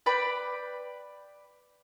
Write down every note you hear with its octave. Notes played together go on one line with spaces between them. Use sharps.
B4 D5 G5 B5